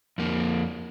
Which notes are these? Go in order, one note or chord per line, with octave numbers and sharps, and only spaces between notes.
F2 A#3